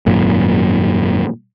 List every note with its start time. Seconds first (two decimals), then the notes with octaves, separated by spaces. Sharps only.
0.06 G#1 F#2 A#2